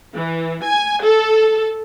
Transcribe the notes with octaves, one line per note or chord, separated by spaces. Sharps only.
E3
G#5
A4